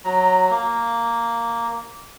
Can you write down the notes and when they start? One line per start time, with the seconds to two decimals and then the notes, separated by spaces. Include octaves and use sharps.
0.05 F#3 A#5
0.51 A#3